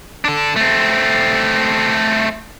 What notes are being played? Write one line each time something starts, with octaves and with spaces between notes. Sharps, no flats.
D4 A4
A3 C4